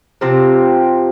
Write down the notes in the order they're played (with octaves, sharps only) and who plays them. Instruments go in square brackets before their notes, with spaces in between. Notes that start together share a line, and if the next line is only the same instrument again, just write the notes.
[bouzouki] C3 F3 C4 G4